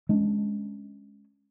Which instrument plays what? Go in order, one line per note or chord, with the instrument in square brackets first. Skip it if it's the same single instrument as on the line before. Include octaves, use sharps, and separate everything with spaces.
[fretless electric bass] G#3 C#4 D4